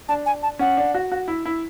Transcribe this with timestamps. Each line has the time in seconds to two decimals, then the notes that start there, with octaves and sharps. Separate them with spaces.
0.09 D4 A5
0.26 G#5
0.43 A5
0.59 C#4 F#5
0.77 D4
0.94 F#4
1.12 F#4
1.28 E4
1.46 E4